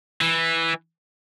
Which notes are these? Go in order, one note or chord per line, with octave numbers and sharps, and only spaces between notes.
E3